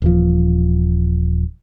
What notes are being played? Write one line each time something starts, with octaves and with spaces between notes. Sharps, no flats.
D#1 E3 F3